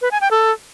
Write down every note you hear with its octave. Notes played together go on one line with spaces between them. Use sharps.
B4
G#5
G5
A4